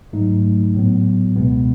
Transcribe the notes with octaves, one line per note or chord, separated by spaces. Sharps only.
G#2 F#3 A3 D#4
A2 F#3 B3
C#2 B2 G#3 B3